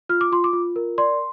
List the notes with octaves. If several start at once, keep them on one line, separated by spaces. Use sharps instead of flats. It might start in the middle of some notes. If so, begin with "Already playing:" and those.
F4 F6
D6
F4 C6
D6
F4
A#4
D5 C6